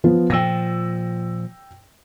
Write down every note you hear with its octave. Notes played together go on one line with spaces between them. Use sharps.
F3 B3 F4
A#2 F3 G5 E6 A#6